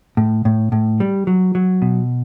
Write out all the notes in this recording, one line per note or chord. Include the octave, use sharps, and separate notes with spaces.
A2
A2
A2
G3
F#3
F#3
B2